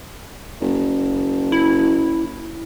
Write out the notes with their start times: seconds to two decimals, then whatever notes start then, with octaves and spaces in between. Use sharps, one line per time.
0.61 F#1
1.52 E4